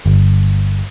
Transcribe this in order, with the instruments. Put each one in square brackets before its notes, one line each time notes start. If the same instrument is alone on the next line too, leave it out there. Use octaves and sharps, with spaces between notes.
[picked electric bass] G1